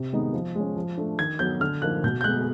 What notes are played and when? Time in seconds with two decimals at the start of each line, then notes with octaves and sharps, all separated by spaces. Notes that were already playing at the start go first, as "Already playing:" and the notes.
Already playing: C3
0.13 D#3 G#3 B3 D#4
0.33 F3
0.55 G#3 C#4
0.76 F3
0.98 A3 D4
1.19 D#3 G#6
1.39 F#3 B3 G6
1.61 D3 F6
1.82 F3 A#3 D#4 F#6
2.04 B2 G6
2.21 G6
2.24 G#3 B3 F#6